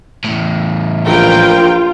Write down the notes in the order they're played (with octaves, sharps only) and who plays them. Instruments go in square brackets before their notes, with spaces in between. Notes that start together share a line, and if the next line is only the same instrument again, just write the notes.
[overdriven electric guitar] E2 A2
[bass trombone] A#1 [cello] F4 [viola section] A#4 B4 G5